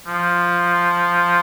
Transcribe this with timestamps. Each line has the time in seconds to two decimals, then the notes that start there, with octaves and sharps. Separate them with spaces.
0.07 F3